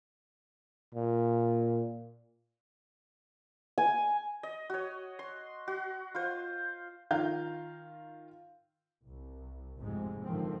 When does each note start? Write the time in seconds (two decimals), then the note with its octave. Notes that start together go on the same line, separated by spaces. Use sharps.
0.95 A#2
3.78 G#5
4.43 D#5
4.70 F#4 C#5
5.19 C6
5.68 F#4
6.15 F4 C5
7.11 D#3 F4 F5 A#5 G6
9.06 C2
9.81 F1 F2 G#2 C3 G#3
10.25 G#2 D3 D#3 F3 C4